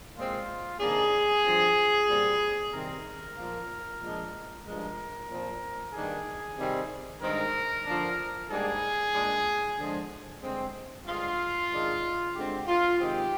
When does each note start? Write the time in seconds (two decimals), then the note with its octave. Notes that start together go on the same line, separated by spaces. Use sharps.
0.16 A#2 G#3 C4 F4
0.80 C3 D#3 A#3 D4 G#4
1.45 G2 F3 C4
2.09 A#2 G3 C4
2.73 C3 D#3 G3 C4 A#4
3.37 A#2 F3 A#3
4.02 A#2 F3 G#3 D4
4.65 G2 F3 G#3 A#4
5.29 A#2 F3 C4
5.94 G2 D#3 A#3 D4 G#4
6.58 C3 D#3 G3 C4
7.22 G2 D#3 G#3 C4 A#4
7.86 D3 F3 A#3 D4
8.50 G#2 G3 A#3 D4 G#4
9.14 A#2 G#3 D4
9.78 D3 F3 G#3
10.42 G2 D3 G#3 C4
11.06 G2 D3 G#3 F4
11.71 G#2 D#3 G#3 D4
12.35 D3 G#3 C4 G4
12.67 F4
13.00 C3 D#3 G#3 C4 G4